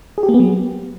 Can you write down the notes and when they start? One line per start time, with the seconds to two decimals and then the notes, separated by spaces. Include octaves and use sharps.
0.18 G#4
0.23 G4
0.29 A#3
0.34 B3
0.40 F#3